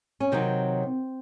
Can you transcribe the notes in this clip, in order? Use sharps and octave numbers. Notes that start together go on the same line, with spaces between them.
C#4
C3 D#3 F#3 C4